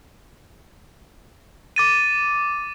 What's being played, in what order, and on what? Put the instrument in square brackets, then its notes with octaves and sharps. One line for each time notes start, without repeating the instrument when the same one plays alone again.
[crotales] D6 A6 D#7